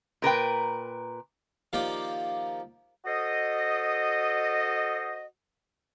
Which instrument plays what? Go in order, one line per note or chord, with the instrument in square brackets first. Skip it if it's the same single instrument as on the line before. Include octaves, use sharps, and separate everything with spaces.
[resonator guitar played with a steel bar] A#2 A#4 B4 G5
[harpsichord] D#3 F3 A#3 G4 A#4 D5
[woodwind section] F#4 A4 C5 D#5